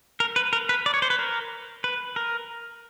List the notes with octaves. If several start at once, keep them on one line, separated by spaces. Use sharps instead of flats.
A#4
B4
A#4
B4
D5
C#5
C5
B4
A#4
B4
A#4